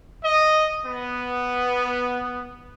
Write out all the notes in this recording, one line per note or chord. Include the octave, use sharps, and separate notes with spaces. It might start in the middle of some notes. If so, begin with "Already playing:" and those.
D#5
B3